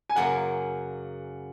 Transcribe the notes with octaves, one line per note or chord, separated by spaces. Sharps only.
G#5
F#2 C#3 F#3 A#3 F#5